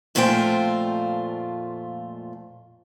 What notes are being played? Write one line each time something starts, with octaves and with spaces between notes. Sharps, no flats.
F2 A#2 A3 F4 C5 G5